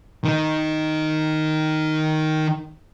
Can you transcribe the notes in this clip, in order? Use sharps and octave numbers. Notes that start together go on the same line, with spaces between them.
D#3 D#4